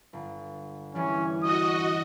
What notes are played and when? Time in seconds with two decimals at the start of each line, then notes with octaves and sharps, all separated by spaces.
0.13 G1
0.95 E3 G3 C#4
1.43 F#4 D#5 D#6